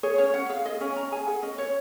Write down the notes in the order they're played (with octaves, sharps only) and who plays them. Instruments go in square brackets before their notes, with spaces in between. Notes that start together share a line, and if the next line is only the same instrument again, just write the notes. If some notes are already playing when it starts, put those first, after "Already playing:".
[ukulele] G#4 C#5
C#4 C#5
C#4 F#5
G#4 F5
G#4 D#5
C#4 G#5
C#4 A#5
G#4 G#5
G#4 F#5
C#4 D#5
C#4 C#5